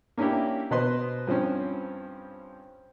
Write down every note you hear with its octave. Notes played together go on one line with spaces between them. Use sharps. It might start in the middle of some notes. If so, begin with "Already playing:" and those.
A#3 C#4 D4 E4 G4
B2 B3 B4 C5 D#5 C6
G2 F3 C4 C#4